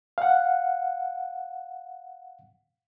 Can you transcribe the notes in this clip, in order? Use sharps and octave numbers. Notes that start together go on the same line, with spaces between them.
F5 F#5